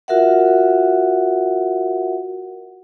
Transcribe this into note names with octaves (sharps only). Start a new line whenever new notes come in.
F4 F#4 A#4 E5 F#5